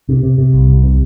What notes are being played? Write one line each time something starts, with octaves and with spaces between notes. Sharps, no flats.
C3
C3
C3
C2
C2
C3